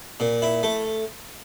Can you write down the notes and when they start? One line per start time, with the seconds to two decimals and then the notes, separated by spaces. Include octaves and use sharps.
0.20 A#2
0.42 E4
0.63 A3